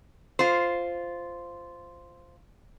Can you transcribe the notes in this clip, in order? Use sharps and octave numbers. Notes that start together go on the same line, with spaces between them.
F4 C5